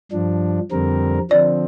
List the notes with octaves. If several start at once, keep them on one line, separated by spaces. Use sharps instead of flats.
G2 F3 D4
F2 D3 G3 C4 A#4
D3 F3 C4 D5